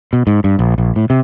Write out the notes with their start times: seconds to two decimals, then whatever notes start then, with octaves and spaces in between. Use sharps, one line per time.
0.13 B2
0.27 G#2
0.44 G2
0.59 A#1
0.78 A#1
0.96 A2
1.10 C3